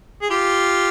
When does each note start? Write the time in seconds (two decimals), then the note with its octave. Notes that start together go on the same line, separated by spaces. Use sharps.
0.22 G#4
0.30 F4 G4